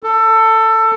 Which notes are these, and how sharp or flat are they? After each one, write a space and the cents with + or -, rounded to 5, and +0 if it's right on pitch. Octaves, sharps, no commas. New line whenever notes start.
A4 +20